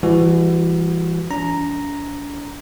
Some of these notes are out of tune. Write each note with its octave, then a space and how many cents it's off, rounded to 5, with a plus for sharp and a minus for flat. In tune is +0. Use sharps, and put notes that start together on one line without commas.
E3 +30 G3 +40 F#4 +0
D4 -40 A#5 +0